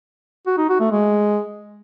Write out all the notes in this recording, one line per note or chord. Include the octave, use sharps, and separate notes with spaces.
F#4
D#4
F#4
A3
G#3